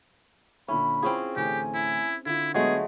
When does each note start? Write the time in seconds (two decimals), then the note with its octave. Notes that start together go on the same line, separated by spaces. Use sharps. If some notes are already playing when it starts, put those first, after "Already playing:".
0.68 A#2 D3 C#4 E5 B5
1.03 C4 C#4 E4 F4 G#4
1.36 A1 D2 A2 G4 G#5
1.74 E4
2.26 D3 E4 F4
2.54 F#3 G#3 A3 B3 G#4